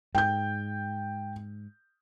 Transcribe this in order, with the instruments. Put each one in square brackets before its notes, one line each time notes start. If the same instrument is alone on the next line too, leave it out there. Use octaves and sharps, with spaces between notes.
[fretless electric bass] G#2 [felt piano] G5 G6